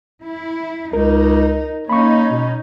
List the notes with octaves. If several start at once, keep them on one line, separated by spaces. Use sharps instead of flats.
E4
C#2 D#4 A#4
A#3 C#4 D#4 B5 C#6
B2